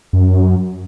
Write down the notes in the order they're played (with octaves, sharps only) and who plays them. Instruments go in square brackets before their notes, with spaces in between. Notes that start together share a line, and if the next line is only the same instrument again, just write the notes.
[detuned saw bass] F#2